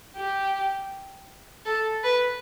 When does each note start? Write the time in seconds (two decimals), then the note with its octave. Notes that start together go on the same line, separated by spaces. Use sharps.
0.16 G4
1.66 A4
2.03 B4